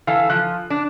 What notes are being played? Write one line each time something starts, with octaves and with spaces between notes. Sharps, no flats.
E3 A4 F5
F3 F#6
D4